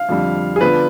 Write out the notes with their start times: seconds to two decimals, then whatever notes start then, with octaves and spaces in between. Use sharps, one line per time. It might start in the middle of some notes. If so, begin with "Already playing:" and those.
Already playing: F5
0.09 F2 D3 G3
0.56 G#4
0.61 D3 F3 B3 D4 F4 B4